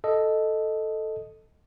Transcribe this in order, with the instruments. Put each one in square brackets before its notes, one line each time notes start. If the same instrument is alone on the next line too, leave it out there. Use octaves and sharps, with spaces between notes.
[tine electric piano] A4 D#5